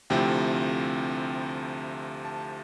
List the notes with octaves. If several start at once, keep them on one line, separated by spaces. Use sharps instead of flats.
D2 C3 F3 C4 E4 G5
A5